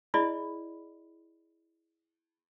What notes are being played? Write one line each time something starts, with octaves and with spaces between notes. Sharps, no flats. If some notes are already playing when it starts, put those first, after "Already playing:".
E4 G#4 D5 D#5 B5